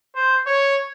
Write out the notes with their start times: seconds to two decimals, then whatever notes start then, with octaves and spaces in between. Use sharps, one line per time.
0.15 C5
0.47 C#5